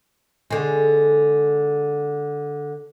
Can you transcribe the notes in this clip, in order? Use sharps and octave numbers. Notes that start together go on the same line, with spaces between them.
D3 G#3